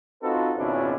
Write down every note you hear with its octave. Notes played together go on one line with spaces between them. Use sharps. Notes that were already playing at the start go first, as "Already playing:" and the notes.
C4 D#4 F4 F#4 A4 B4
G#1 C#2 B2 C#4 D4 E4